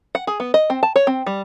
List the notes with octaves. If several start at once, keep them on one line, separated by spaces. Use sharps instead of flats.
F#5
G#4
B3
D#5
C4
A5
C#5
C4
G3